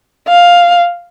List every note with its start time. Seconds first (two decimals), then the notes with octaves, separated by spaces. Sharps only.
0.28 F5